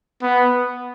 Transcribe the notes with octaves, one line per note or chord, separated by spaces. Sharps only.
B3